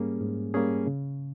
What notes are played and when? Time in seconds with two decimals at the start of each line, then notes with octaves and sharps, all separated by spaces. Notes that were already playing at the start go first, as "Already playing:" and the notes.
Already playing: G#2 G3 A#3 C#4 G#4
0.21 G#2
0.54 G3 A#3 C#4 G#4
0.87 C#3